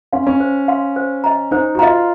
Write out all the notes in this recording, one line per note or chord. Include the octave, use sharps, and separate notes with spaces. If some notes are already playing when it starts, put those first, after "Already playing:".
C#4 F5 C6
C#4
C5
F5 C6
C5
D#5 A#5
D#4 C5
F#4
F4 D#5 A#5